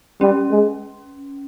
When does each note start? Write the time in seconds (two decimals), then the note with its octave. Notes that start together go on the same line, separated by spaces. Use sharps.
0.21 G3 C#4
0.51 G#3